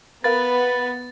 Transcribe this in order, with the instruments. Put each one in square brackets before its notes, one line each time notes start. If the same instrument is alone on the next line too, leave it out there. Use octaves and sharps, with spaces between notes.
[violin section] B3 [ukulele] A#4 F5 [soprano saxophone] B4 [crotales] A6